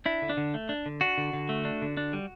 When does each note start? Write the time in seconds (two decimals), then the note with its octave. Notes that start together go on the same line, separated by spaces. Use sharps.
0.06 D4 E4
0.22 D3
0.29 D4
0.37 D3
0.54 A3
0.69 D4
0.86 D3
1.01 D4 F#4
1.18 D3
1.33 D3
1.49 A3
1.65 D4
1.82 D3
1.97 D4
2.13 G3